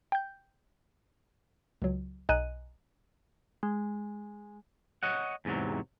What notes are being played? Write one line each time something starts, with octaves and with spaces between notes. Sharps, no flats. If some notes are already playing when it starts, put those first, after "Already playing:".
G5 G6
C#2 F#3
B1 D#5 G#5 A#5 F#6 D#7
G#3
C#5 D#5 F#5
E2 G#2 C3 F#3